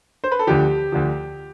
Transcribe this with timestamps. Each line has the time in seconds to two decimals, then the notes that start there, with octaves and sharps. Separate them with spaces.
0.24 C5
0.32 B4
0.39 A4
0.47 D2 D3 F3 G4
0.92 D2 D3 F3